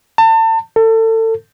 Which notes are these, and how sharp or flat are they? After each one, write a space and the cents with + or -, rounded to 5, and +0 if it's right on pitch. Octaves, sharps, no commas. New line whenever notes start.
A5 +35
A4 +30